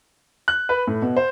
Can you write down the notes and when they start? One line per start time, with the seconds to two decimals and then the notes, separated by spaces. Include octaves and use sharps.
0.48 F#6
0.69 B4
0.87 A2
1.02 B2
1.16 C5